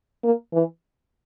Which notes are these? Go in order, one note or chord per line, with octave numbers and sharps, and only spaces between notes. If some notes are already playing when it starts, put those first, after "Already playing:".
A#3
E3